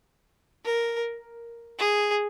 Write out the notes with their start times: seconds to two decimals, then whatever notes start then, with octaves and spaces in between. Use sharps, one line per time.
0.65 A#4
1.79 G#4